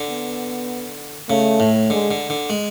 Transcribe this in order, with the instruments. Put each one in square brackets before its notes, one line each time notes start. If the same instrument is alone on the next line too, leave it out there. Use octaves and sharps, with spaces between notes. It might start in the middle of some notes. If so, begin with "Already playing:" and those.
Already playing: [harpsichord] D3
[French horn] B3
[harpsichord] C#3 [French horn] A3
[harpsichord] A2
[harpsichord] D3 [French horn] G#3
[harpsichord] D3
D3
G#3